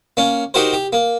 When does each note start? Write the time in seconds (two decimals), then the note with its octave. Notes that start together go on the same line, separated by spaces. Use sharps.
0.17 A#3 C#4
0.54 D#4 F#4 G4 A#4 C5
0.73 G4
0.93 A#3